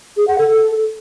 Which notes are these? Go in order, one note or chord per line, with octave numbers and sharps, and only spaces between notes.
G#4
F#5
A4